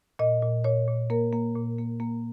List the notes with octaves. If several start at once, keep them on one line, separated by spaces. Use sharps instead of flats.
A#2 D#5
A#2
A#2 C#5
A#2
A#3 A#4
A#3
A#2
A#3
A#3